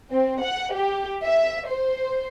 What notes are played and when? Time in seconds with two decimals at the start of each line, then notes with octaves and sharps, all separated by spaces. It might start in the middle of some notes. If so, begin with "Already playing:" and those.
0.12 C4
0.43 F#5
0.75 G4
1.25 E5
1.68 C5